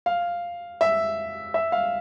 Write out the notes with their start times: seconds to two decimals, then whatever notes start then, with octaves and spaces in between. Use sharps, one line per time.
0.06 F5
0.81 E5
1.54 E5
1.72 F5